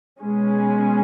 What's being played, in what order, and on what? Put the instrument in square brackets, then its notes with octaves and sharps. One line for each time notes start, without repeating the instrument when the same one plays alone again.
[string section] B2 G#3 C#4